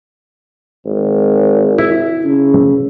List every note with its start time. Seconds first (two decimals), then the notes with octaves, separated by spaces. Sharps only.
0.85 G#1
1.78 E4
2.24 C#3